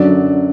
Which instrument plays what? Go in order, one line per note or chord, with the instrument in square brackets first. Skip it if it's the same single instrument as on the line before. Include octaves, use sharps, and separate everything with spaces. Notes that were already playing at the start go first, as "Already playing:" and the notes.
Already playing: [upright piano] F#2 D3 F#3 D5